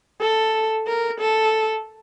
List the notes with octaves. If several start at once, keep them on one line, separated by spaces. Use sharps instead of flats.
A4
A#4
A4